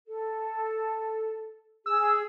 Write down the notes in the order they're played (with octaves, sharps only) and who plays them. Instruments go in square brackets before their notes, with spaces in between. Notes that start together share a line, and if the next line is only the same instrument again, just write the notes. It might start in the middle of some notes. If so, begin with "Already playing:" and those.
[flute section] A4
[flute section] G#4 [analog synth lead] E6